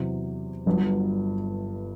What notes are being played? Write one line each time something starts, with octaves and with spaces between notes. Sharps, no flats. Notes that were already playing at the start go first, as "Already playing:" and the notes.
Already playing: E2 C3 F#3
G1 G2 F#3